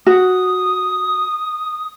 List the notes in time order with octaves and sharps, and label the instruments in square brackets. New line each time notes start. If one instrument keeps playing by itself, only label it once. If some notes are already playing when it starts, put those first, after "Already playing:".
[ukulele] F#4 [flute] D#6